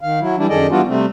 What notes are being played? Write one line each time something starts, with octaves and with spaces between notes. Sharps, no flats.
D#3 F5
F#3 E4
E3 G3 D4 E4
F#2 D#3 G#4 A4 D5 D#5
E3 G3 B3 D4 F4 F#4
C3 G3 A3 C4